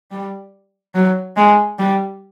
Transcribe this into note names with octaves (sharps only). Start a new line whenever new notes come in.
G3
F#3
G#3
G3